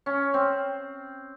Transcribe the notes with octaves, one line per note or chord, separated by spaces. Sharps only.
C#4
C4